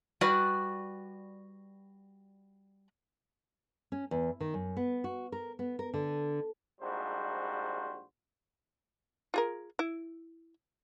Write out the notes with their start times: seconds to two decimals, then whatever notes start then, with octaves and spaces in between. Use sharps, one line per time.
0.21 G3 F#4 B4 D5
3.92 C#4
4.11 E2
4.40 D#3
4.54 F#2
4.77 B3
5.04 F#4
5.32 A#4
5.59 B3
5.79 A#4
5.94 D3
6.81 A#1 G#2 G3 F#4 C5
9.34 F4 G#4 A#4
9.79 E4